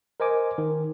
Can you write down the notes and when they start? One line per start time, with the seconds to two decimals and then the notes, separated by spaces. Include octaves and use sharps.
0.20 A#4 C5 D#5 G#5 D6
0.58 D#3